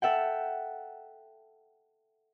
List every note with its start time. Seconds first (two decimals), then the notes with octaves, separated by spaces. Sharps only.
0.02 A4 E5 F#5 G5